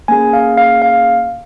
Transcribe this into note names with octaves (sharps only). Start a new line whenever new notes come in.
A#3 C#4 G#4 G#5
F5
F5
F5